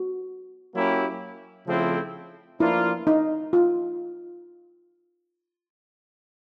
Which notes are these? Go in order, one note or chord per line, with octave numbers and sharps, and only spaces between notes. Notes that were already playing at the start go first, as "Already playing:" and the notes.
Already playing: F#4
F#3 A#3 C#4 E4 G4
C#3 F3 A3 C4 E4
F3 A#3 D4 E4 F4
D#4
F4